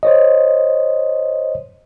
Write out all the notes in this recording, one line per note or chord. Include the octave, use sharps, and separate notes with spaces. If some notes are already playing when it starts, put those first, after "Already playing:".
C5 C#5 D#5